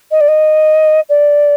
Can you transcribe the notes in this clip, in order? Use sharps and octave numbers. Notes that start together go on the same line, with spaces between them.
D#5
D5
D#5
D5